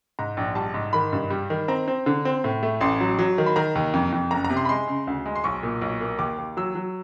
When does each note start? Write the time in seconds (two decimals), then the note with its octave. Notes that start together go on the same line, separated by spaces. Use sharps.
0.19 G#2 A#5
0.37 A#1
0.55 G3 A5
0.74 G#2
0.93 D#3 B5
1.13 G2
1.30 G3
1.50 D#3
1.68 C4 A#5
1.88 C4
2.06 D3
2.25 C4
2.44 A2
2.63 A3
2.81 A1 C6
3.00 F#3
3.19 F#3
3.38 D#3
3.46 B5
3.56 D#3 A#5
3.75 D#2
3.94 F2
4.12 F2
4.31 F#1 A#5
4.44 A#5
4.50 C3
4.57 C6
4.65 B5
4.69 G#3 C6
4.88 C#3
5.07 D2
5.26 G#3
5.35 C6
5.44 B1 C#6
5.63 A#2
5.82 B1
6.01 A#3
6.19 D#2 D6
6.38 D#2
6.57 F#3 E6
6.75 F#3